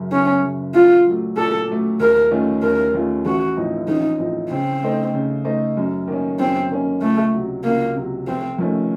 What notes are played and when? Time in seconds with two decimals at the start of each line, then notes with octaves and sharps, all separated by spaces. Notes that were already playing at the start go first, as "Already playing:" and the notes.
Already playing: F#1 F#2 C#3
0.12 F#1 C#4
0.43 F#2 C#3
0.74 A#2 F4
1.06 F#3 A3
1.37 A#2 A4
1.68 F#3 A3
2.00 D#2 A#4
2.31 D#3 A3 C#4 F4
2.63 D#2 A#4
2.94 D#3 A3 C#4 F4
3.26 A1 F#4
3.57 A2 F3 C4 D#4
3.88 A1 D#4
4.20 A2 F3 C4 D#4
4.51 C#3 C4
4.83 A3 D#4 A4 C5
5.14 C#3
5.45 A3 D#4 A4 C5
5.77 F#2
6.08 D#3 A#3 C#4
6.39 F#2 C4
6.71 D#3 A#3 C#4
7.02 C#2 A3
7.34 C3 F#3
7.64 C#2 A#3
7.96 C3 F#3
8.27 F1 C4
8.59 F2 D#3 A3 C#4